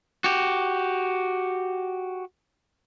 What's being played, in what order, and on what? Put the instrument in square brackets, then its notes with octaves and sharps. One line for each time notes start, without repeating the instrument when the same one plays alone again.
[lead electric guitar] F#4 G4